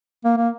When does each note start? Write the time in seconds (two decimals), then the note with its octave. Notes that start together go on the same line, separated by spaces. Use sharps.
0.25 A#3
0.37 A#3